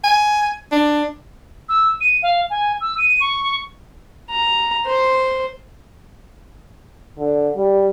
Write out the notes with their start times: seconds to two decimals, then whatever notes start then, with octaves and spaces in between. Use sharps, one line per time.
0.04 G#5
0.72 D4
1.69 E6
2.01 D#7
2.23 F5
2.50 G#5
2.81 E6
2.98 D#7
3.21 C#6
4.30 A#5
4.86 C5
7.18 D3
7.57 G3